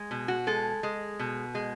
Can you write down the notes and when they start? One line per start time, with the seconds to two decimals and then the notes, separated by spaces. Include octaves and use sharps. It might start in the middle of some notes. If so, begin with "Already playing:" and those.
Already playing: G#3
0.11 B2
0.28 F#4
0.47 G#3 A4
0.83 G#3
1.19 B2
1.55 G#3